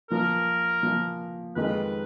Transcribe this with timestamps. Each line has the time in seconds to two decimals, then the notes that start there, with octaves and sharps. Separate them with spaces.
0.10 A#2 F3 A#3 A#4
0.83 A#2 F3 A#3
1.56 F2 D#3 G#3 D#4 A#4 B4